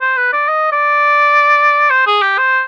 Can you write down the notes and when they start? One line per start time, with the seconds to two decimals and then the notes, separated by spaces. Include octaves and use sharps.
0.01 C5
0.17 B4
0.33 D5
0.48 D#5
0.72 D5
1.90 C5
2.06 G#4
2.22 G4
2.38 C5